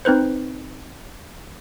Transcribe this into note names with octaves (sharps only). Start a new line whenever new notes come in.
C4 D#4 B4 C5